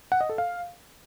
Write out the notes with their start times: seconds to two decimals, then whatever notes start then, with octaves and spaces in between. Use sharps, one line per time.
0.12 F#5
0.21 D#5
0.29 A4
0.38 F5